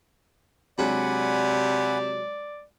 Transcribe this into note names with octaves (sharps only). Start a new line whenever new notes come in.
C3 F#3 G#3 D4 D5 F#5 G#5 B5